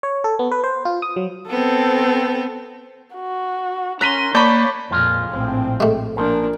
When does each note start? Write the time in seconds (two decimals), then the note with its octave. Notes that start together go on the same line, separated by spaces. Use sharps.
0.03 C#5
0.24 A4
0.39 B3
0.51 B4
0.64 C5
0.85 F4
1.02 D#6
1.16 F#3
1.50 B3 C4 A4
3.15 F#4
4.01 C#4 A#4 A#5 C6 F#6 B6 D#7
4.35 A#3 C#5 D5 A5 B5 C#6 G6
4.91 F2 A#2 F3 G#3 F4
5.31 A#1 A2 C4
5.80 G#3 A3
6.16 A#1 A#2 F3 A#3 D4